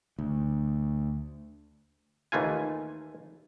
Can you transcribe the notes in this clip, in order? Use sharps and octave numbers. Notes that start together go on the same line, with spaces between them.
D2
D#2 E3 A3 F4 G#5